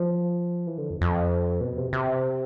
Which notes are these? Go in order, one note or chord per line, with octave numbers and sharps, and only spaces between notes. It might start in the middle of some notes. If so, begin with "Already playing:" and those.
Already playing: F3
E3
D3
F2
F2
B2
C3
C3